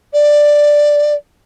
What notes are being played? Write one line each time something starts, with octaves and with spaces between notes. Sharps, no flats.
D5